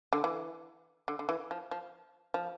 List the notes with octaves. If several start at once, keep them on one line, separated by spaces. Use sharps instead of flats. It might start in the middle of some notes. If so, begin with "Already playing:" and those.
D3
E3
D3
D3
E3
F3
F3
F3